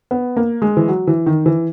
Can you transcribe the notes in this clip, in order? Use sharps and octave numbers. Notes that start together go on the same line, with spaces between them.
B3
A#3
G#3
E3
F#3
E3
D#3
E3